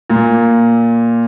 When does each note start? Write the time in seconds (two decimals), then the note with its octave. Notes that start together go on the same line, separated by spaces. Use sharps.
0.10 A#2